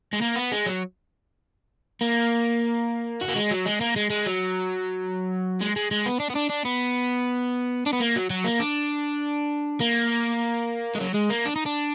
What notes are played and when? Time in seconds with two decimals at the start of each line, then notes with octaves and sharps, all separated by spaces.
0.13 G#3
0.22 A#3
0.36 B3
0.52 G#3
0.66 F#3
2.01 A#3
3.22 F#4
3.29 A#3
3.36 G#3
3.51 F#3
3.66 G#3
3.81 A#3
3.96 G#3
4.10 G#3
4.26 F#3
5.61 G#3
5.76 G#3
5.91 G#3
6.06 B3
6.20 D4
6.30 B3
6.36 D4
6.50 D4
6.65 B3
7.86 D4
7.93 B3
8.00 A#3
8.16 F#3
8.30 F#3
8.45 A#3
8.60 D4
9.80 A#3
10.95 G#3
11.00 F#3
11.14 G#3
11.30 A#3
11.45 D4
11.56 D#4
11.66 D4